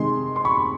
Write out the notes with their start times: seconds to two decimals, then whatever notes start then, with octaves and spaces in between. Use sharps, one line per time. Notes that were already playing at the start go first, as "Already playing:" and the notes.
Already playing: C3 D#3 G#3 C6
0.36 C6
0.45 B5 C#6